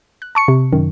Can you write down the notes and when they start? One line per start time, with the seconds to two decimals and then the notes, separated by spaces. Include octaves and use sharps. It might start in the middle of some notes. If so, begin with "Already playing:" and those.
0.22 F#6
0.35 A5 C#6 C#7
0.48 C3
0.72 F#2 D#3